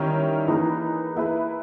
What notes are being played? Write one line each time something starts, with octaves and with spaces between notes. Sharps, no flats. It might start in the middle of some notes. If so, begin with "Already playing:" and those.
Already playing: D#3 G3 C#4 E4 A#4
E3 A#3 D#4 G#4 B4
A#3 E4 G#4 B4